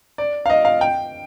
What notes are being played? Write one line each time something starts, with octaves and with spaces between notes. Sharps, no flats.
D5
F5
D#5
F5
G5